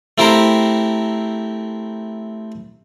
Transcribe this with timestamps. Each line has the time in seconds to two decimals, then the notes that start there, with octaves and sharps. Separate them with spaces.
0.18 A3 C4 E4 G4 A#4 C5